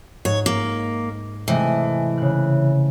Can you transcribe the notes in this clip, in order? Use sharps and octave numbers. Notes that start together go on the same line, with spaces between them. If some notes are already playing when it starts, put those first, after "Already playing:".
G#2 C#5
A#3
C3 E3 G#3 A3
C#3 F#6